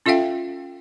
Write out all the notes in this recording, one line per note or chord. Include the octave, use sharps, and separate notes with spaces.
C#4 F4 A4 E5 F5 G5